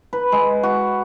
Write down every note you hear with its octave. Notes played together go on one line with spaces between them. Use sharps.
B4
G#3
F#4